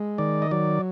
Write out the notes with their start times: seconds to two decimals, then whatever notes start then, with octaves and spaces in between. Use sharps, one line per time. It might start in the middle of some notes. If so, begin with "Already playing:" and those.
Already playing: G#3
0.18 D#3 D5
0.42 D#5
0.51 F#3 D5